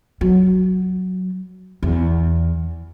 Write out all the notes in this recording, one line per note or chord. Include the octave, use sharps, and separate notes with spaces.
F#3
E2